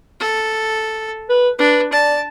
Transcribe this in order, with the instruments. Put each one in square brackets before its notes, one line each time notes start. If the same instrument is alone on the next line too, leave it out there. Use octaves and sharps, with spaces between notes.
[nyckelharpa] A4
[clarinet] B4
[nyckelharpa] D4 [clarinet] B4
[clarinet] D5 [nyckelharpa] A5